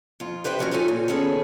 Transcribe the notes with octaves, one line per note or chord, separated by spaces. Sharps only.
F2 F4
G4 B4 C5 E5 G5
D3 F3 G3 C#4 F#4 A#4
D#4 F4 A4 C#5 E5 G#5
A#2 C4
D#3 B3 C#4 G#4 A4